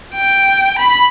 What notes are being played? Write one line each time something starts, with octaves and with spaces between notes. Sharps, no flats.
G5
B5